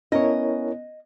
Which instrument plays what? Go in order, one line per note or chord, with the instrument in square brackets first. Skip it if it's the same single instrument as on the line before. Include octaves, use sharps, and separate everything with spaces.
[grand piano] B3 C#4 [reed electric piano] E4 A#4 C#5 [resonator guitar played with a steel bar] D#5